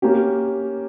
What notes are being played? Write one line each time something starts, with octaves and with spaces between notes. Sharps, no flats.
A#3 C#4 G4